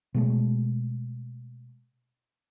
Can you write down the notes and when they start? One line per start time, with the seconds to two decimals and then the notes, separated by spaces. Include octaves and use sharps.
0.14 B2 G#3 A3